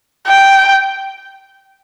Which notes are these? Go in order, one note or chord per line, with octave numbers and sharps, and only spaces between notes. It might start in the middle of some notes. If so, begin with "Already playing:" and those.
G5